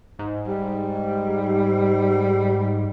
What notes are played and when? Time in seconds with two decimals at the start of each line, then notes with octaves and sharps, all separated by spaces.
0.19 G#2
0.47 G3